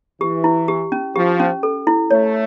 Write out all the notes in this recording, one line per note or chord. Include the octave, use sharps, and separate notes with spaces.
E3 G4
E4
G4
C#4
F3 G4
C#4
A4
E4
A3 C#5